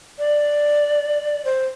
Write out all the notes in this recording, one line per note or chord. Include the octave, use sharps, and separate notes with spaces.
D5
C5